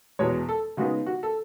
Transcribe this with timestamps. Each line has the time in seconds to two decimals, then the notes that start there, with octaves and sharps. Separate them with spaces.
0.19 E2 B2 G#3 C#5
0.49 A4
0.77 C#3 G#3 B3 D#4 F#4
1.07 F#4
1.23 A4